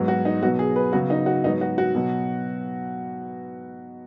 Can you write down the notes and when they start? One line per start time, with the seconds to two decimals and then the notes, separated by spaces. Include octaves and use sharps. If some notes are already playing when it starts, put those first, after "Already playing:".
Already playing: G#2 F#3 B3
0.08 F#4
0.25 D#4
0.42 B2 F#3 B3 F#4
0.59 G#4
0.76 B4
0.93 C#3 F#3 B3 F#4
1.10 D#4
1.26 F#4
1.43 G#2 F#3 B3 D#4
1.61 F#4
1.78 F#4
1.95 B2 F#3 B3